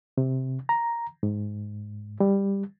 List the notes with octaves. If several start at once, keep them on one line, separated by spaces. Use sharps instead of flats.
C3
A#5
G#2
G3